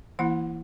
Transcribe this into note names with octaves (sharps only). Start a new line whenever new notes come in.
E3 A#3 E4 F#5